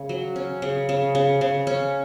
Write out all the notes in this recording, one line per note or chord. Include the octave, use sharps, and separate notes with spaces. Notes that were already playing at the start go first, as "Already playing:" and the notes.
Already playing: C#3
F#3
C#4
C#3
C#3
C#3
C#3
C#4